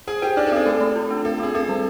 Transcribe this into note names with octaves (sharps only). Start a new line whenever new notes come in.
G#4 C5 G#5
G4 C5 G5
D4 D#4 D5
A4
C4 G#4
A3 A4
A3
F4
D4
C4 A4
C4 G#4
C4 A4
G3